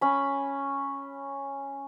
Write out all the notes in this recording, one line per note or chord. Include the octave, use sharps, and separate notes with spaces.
C#4 B5